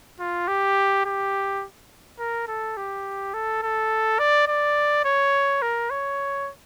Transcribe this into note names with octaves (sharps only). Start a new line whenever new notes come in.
F4
G4
G4
A#4
A4
G4
A4
A4
D5
D5
C#5
A#4
C#5